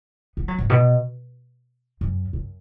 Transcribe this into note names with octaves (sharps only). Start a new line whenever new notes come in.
B3
F#3
G#2
B2
F#2
F#2